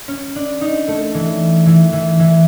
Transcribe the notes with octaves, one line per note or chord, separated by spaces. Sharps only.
C#4
D4
D#4
A3
E3
E3
E3
E3